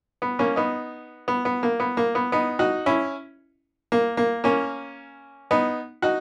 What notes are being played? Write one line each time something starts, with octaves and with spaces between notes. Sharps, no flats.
B3
A#3 C#4
B3 D#4
B3
B3
A#3
B3
A#3
B3
B3 D#4
D#4 F#4
C#4 E4
A#3
A#3
A#3 C#4
B3 D#4
D#4 F#4